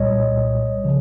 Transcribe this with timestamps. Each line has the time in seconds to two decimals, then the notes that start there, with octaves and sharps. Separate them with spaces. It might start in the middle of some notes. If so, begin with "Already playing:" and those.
Already playing: C2 A#2 G3 C#5 D#5
0.84 C#3 F3